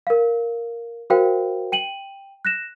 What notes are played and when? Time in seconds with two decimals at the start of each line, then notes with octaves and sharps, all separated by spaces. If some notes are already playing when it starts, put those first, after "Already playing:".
0.07 A#4 F5
1.10 F#4 A#4 C5 F5 G5
1.72 G5 D#7 F#7
2.45 F#6 A#6 E7